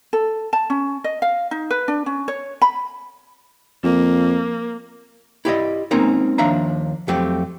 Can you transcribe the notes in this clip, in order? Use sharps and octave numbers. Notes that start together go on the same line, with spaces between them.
A4
A5
C#4
D#5
F5
D#4
B4
D4
C#4
C#5
B5
F2 A#3
E4 G4 D5 D#5
G#3 A#3 C4 C#4 D#4 A#4
D#2 F3 D4 E5 F5 A#5
F2 F#3 A3 C4 G4